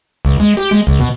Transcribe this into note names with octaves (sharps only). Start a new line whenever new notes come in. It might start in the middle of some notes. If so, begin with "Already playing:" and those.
C#2
G#3
G4
G#3
C#2
B2